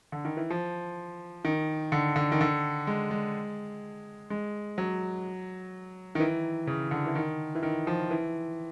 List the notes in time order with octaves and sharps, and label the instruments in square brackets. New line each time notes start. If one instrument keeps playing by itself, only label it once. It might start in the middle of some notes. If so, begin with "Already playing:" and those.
[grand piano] D3
D#3
E3
F3
D#3
D3
D3
D#3
D3
G#3
G#3
G#3
F#3
D#3
E3
C#3
D3
E3
D#3
E3
D#3
F3
E3